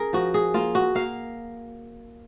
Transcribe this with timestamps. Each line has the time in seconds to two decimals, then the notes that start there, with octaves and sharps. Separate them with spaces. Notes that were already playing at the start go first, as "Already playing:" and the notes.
Already playing: C#4 G#4 A#4
0.13 F3 F#4
0.34 G#4
0.54 A#3 F4
0.75 F#4
0.95 A#3 F5